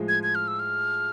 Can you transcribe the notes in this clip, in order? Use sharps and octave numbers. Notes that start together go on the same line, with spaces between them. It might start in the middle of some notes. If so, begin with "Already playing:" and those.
Already playing: A2 F3 G#3
G#6
G#6
F6
E6
F6